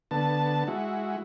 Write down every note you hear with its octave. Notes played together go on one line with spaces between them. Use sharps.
D3 B3 A5
G#3 E4 F#4